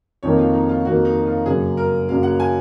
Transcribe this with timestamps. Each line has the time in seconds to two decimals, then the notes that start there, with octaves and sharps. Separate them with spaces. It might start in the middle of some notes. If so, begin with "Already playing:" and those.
0.23 F2 D#3 A#3 C#5
0.39 F4
0.53 D#4
0.69 F4
0.84 F2 D#3 A#3 F#4
1.05 D#4
1.26 F4
1.46 F#2 C#3 F#3 A#3 G#4
1.77 A#4
2.09 F#2 C#3 F#3 A#3 F5
2.23 F#5
2.40 G#5